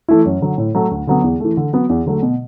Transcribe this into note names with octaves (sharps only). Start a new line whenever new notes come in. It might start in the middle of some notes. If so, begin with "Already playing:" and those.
E3 A3 E4
F#2
D3 F#3
A2
F#3 A3
D2
D3 F#3 B3
E2
E3 A3
D3
F#3 B3 F#4
E2
D3 F#3 A3
B2